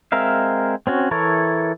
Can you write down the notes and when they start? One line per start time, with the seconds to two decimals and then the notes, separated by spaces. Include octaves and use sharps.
0.12 G#3 C4 A#4 E5 F5
0.87 C4 C#4 F#4
1.11 E3 E4 A4 A#4 C#5